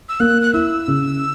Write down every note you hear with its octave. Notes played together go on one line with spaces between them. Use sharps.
E6
A#3 F#6
F#6
E4 E6
C#3